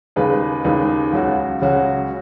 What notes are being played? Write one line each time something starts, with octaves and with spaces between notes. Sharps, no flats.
D#2 C#3 G#3 D#4 B4
D#2 C#3 G#3 D#4 B4
C#2 C#3 F#3 C#4 F#4
C#2 C#3 F#3 C#4 F#4